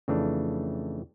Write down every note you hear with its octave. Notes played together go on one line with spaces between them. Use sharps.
F2 C#3 E3 A3 D4